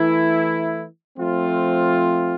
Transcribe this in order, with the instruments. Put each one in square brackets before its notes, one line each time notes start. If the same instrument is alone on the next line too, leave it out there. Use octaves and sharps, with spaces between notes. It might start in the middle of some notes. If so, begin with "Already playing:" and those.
Already playing: [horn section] E3 A3 E4
F3 A3 C4 F4